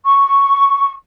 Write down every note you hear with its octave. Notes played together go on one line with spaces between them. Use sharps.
C#6